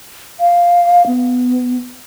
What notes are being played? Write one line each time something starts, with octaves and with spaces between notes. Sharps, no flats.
F5
B3